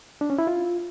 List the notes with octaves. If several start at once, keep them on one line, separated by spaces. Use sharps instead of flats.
D4
C#4
E4
F4